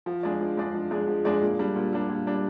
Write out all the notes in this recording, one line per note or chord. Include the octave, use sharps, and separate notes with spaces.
F3
G#3 D4 G#4 D5
F3
G#3 D4 G#4 D5
F3
G#3 D4 G#4 D5
F3
G#3 D4 G#4 D5
A#2
G3 D4
A#2
G3 D4
A#2
G3 D4